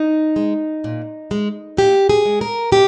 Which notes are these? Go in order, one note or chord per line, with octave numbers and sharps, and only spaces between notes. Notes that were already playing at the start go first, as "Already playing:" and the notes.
Already playing: D#4
G#3
A#2
G#3
A#2 G4
G#4
G#3
A#4
C3 G4